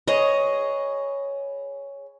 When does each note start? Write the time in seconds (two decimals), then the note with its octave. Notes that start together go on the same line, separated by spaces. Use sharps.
0.08 G#4 B4 C#5 D#5